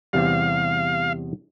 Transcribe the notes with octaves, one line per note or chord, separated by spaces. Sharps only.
E2 C3 G3 F5